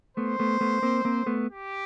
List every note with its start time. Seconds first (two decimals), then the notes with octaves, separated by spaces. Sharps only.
0.17 A3 B3 C5
0.39 A3 B3
0.61 A3 B3
0.82 A#3 C4
1.05 A#3 C4
1.26 A3 B3
1.49 G4